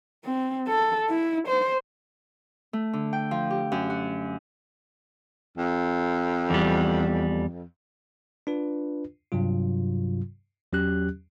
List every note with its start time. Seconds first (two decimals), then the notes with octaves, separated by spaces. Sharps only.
0.25 C4
0.68 A4
1.10 E4
1.48 C5
2.73 A3
2.93 D3
3.13 G5
3.31 F3
3.50 G4
3.72 F#2
3.90 F#4
5.57 F2
6.50 E2 G3
8.47 D4 F4 B4
9.32 G2 C3 F#3 F4
10.73 E2 F#3 C#4 G4 F#6